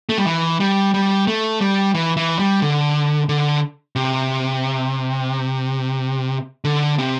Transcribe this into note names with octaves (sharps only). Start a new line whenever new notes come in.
A3
G3
E3
G3
G3
A3
G3
E3
E3
G3
D3
D3
C3
D3
C3